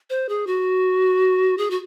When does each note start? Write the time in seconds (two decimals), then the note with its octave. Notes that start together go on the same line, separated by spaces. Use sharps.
0.10 C5
0.29 G#4
0.47 F#4
1.58 G#4
1.70 F#4